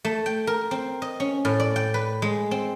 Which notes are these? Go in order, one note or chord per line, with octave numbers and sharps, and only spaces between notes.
A3
G5
A#4
C4
D#5
C#4
A2
D5
G5
B4
G#3
C4